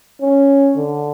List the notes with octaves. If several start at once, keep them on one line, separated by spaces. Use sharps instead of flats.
C#4
D3